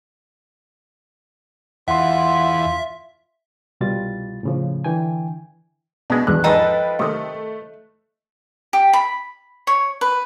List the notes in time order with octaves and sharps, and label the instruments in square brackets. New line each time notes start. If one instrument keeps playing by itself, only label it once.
[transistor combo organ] E2 [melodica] F4 [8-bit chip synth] E5 [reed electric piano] F#5 C6
[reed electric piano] C2 B2 G3 F4 A6
A2 C#3 F3
D3 E3 G5 G#5
[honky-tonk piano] B2 [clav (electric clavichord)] G#3 D4 [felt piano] B3
[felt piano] B1 E2 D4 [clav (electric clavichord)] D3 [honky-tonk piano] F#6
[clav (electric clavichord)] G#2 A#5 [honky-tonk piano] F3 B4 [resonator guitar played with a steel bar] A4 D#5 [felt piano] G5
[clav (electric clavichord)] C3 D#3 [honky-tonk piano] A3
[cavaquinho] G4
B5
C#5
B4